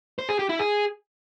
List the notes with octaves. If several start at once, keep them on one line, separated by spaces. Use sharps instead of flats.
C5
G#4
G4
E4
G#4